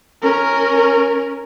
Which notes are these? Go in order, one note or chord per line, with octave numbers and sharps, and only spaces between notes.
C#4 A#4